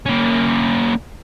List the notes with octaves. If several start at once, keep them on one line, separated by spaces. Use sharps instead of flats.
A#3 C#4